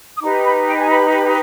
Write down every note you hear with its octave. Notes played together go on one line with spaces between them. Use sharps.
D#6
D#4 G4 B4 D6
B5
G5
G#5
B5